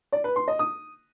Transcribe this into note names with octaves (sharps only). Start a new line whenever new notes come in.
D5
B4
C6
D#5
D#6